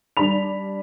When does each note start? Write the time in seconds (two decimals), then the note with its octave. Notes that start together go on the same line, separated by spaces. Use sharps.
0.17 G3 D4 D5 B5 F7